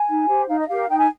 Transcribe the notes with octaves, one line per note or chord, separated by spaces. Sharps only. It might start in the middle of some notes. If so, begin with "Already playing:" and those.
Already playing: G#5
D#4
G4 C5
D#4 F5
D#5
G4 A#4 F5
D#4 G5
G#5